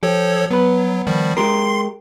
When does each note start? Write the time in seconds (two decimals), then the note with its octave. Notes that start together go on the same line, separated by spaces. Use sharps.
0.03 F3 G4 A4 C#5
0.51 F#3 B3 B4
1.07 D#3 F3 G3
1.37 G#3 G4 A#4 C6 C7